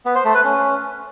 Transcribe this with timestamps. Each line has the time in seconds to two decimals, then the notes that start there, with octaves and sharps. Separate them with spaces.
0.06 B3
0.15 C5
0.25 A3
0.34 B4
0.44 C#4